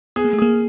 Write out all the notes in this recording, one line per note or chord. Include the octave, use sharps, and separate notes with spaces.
B3 G#4
A#3
A3
A#3 G#4